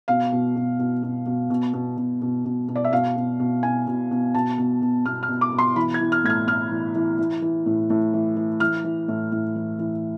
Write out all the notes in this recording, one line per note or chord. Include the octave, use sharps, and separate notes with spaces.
B2 F5
B2
B2
B2
B2
B2
B2
B2
B2
B2
B2
B2
D5
E5
B2 F5
B2
B2
B2 G#5
B2
B2
B2 A5
B2
B2
B2 F6
F6
B2
D6
B2
C6
E3 B5
G#6
E3
F6
A2 G#6
F6
A2 F6
E3
E3
E3
E3
A2
A2
E3
E3
E3 F6
E3
A2
A2
E3
E3